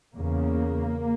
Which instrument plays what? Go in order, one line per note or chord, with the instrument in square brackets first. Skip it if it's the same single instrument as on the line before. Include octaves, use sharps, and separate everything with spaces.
[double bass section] E2 C#3 A#3